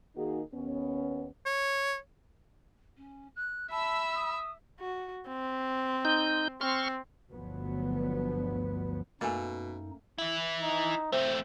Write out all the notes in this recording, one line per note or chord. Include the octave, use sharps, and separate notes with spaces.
D#3 A#3 D#4 F#4 G#4
D#2 B3 C#4
C#5
C#4
F#6
E5 A5 B5 E6
D#6
F#4
C4
D#4 G6
C4 C6 C#6 F6
G1 D2 F3 F#3 B3
F#2 B2 A3 A#3 D#4 D#5 G#5
E3 E4
D#4
A3 C4 C5 E5